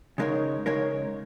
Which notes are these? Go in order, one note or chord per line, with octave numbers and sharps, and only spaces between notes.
C#3 G#3 D#4 A#4 C#5
C#3 G#3 D#4 A#4 C#5